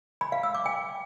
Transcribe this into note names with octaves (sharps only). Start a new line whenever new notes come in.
B5
F5
E6
D6
G5